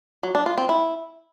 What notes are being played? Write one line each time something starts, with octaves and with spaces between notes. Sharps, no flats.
F#3
D4
F4
C4
E4